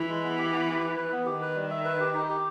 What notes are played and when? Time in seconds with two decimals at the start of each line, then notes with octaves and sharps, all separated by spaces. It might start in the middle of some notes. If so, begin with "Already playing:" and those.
Already playing: E3
0.09 G#3
0.24 B3
0.38 G4
0.53 B3
0.68 G4
0.82 B4
0.96 B4
1.12 B3
1.26 D#3 G4
1.41 B4
1.56 G3
1.71 E5
1.85 B4
2.00 G4
2.14 D#4
2.29 G4